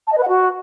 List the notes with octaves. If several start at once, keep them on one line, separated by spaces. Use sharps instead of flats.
A5
D#5
B4
F#5
F#4